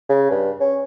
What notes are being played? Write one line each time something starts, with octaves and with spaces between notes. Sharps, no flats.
C#3
G2
C#4